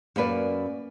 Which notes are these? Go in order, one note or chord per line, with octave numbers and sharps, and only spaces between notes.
F#2 A#3 B4 D5